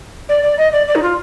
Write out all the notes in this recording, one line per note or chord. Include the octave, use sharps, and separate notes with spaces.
D5
D5
D#5
D5
D5
D#4
F4